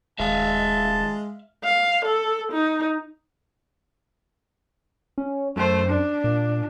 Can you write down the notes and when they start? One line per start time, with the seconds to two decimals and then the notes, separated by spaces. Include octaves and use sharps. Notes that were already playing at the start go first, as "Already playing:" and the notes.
0.20 D#1 G#3 E5 F5 A5
1.65 F5
2.05 A4
2.52 D#4
5.18 C#4
5.56 F#2 A3 C5
5.88 D4
6.24 A#2